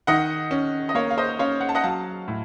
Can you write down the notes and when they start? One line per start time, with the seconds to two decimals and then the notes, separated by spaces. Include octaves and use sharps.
0.07 D#3 D#5 F#5
0.51 C#4
0.89 D#5
0.95 A#3 C#5 F5
1.11 F5
1.17 C5 D#5
1.39 C#4 C#5 F5
1.61 F#5
1.69 A5
1.75 D#5 F#5
1.83 F#3 F5 A5
2.28 A2